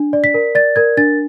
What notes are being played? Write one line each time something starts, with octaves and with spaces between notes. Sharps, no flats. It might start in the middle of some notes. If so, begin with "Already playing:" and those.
Already playing: D4
D5
B6
A#4
D5 A6
A#4 G#6
D4 A6